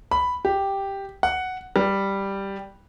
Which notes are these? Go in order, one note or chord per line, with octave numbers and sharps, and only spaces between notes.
B5
G4
F#5
G3